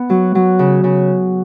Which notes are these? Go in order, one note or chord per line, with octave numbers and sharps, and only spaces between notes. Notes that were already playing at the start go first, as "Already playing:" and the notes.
Already playing: B3
F#3
F#3
C#3
C#3